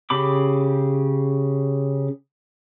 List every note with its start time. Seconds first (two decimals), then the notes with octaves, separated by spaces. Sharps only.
0.10 C#3 G4 B5 D6